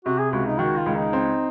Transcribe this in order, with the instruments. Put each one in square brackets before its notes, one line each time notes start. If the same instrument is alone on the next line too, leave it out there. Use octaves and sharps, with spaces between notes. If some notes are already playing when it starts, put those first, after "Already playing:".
[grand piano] C3 [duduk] F#4
[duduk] G#4
[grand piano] C#2 [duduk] F#4
[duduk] D#4
[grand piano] D#3 [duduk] F#4
[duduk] F4
[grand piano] C#2
[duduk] D#4
[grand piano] C4